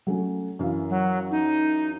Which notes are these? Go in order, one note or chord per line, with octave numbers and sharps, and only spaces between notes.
F#3 A3 C#4
F#2 E3 F5
F#3
D#4